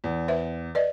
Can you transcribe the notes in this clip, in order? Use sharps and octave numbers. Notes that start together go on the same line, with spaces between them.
E2
B4 C5 E5
B4 D5 D#5